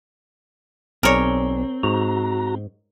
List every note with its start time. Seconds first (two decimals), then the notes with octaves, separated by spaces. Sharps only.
1.03 B1 C4 G#4 A#4 C#5 D5
1.83 G#2 F#4 A#5